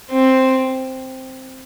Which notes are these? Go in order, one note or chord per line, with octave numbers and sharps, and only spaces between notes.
C4